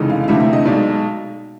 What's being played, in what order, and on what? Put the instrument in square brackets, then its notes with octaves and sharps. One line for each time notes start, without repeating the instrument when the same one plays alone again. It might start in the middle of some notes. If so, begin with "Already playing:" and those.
Already playing: [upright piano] F1 D#2 C#3 E3 G#3
F5
F5
E1 D2 C3 E3 A3 E5
E5
D#5
B1 B2 G#3 D5